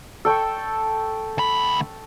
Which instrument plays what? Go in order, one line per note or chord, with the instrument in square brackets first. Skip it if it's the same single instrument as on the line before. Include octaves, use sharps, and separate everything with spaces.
[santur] A4 G5 C#6
[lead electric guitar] D2 B5